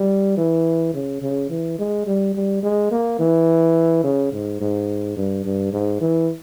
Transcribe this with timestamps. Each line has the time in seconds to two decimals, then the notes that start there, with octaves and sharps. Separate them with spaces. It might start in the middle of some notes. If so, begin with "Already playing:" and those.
Already playing: G3
0.37 E3
0.94 C#3
1.22 C#3
1.50 E3
1.79 G#3
2.07 G3
2.35 G3
2.63 G#3
2.91 A#3
3.19 E3
4.04 C#3
4.32 G#2
4.61 G#2
5.17 G2
5.45 G2
5.73 G#2
6.01 E3